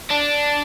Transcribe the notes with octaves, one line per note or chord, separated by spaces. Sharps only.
D4